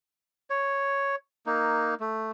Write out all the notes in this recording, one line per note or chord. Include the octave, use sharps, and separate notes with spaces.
C#5
A#3 D#4
A3